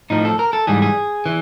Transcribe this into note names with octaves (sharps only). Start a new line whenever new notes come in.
A2 F3 D#4
A4
A#4
A4
G#2 E3 G3 G#4
G#4
E3